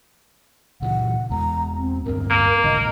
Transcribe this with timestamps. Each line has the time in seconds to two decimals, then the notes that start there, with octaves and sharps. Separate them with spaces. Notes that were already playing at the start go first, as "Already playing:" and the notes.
0.82 A#2 C#3 E3 F#5
1.31 E1 E2 G#3 A#5
1.78 C4
2.06 D1 G2 C4 A#4
2.30 A#3
2.64 A#1 G#2 C#3 D#5